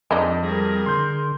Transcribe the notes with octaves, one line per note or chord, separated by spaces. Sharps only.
F2 G#3 D4 D#4
G3 G#4 A#4 A#6
D3 C6 G6